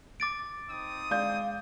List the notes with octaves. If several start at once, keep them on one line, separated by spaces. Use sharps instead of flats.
D6 A6 D7
C4 D#4 D#6
G#3 D5 F5 G6